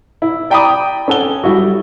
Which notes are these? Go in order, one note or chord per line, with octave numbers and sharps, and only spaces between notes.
E4
D5 G5 A#5 B5 D6 D#6
C#4 A4 F#5 G7
G3 E4 F#4